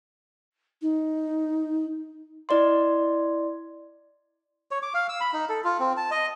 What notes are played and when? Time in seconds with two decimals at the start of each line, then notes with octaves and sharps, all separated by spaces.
0.81 D#4
2.49 E4 D5 D#5 C6
4.71 C#5
4.83 D6
4.94 F5
5.09 E6
5.21 B5
5.33 D#4
5.49 A4
5.64 F4
5.80 C4
5.97 A5
6.11 D#5